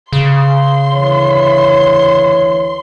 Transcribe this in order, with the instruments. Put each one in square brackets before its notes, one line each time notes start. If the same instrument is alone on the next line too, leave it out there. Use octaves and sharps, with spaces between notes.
[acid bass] C#3 [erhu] C6
[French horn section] D2 E3 C#5